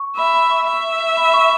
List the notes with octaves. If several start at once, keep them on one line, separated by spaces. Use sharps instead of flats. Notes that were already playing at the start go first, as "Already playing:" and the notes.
Already playing: C#6
E5 B5
B5
C#6
E5 C#6
B5
C#6